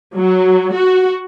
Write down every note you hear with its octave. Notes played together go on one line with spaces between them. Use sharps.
F#3
F#4